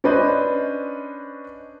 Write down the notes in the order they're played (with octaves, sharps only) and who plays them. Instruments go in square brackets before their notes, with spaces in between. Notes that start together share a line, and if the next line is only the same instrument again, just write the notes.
[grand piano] C#4 D4 B4 C5 D#5